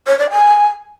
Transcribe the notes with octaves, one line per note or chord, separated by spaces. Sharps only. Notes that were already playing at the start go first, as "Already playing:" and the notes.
C#5
D5
G#5